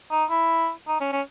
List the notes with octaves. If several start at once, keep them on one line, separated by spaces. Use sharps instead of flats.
D#4
E4
D#4
C#4
C#4